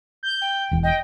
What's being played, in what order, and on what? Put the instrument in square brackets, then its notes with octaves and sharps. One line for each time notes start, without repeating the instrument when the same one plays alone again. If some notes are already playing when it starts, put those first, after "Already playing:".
[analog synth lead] G6
[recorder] G5
[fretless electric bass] E1 E2
[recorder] D#5 [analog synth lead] G5